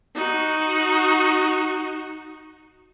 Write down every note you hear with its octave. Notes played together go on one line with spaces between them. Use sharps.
D#4 F#4